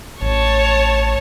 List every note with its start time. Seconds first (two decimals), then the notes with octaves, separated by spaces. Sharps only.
0.22 A1 C#5 A5